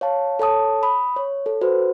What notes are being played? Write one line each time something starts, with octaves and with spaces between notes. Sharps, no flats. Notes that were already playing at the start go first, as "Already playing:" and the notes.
C#5 F5 A5
A4 C#5 A5 D#6
B5 D#6
C#5
A4
F#4 B4 C5